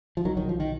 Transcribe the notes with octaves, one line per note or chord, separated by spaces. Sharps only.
F3
B1 D#3 F#3
D#3 F#3
B1 F3
D#3